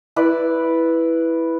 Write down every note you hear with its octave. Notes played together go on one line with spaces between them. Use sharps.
E4 B4 D5